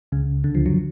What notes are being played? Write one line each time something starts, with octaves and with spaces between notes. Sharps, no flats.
C#2 C#3
D2 D3
F3
F#2 F#3